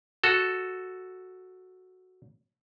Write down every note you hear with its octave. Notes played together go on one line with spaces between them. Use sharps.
F#4 A4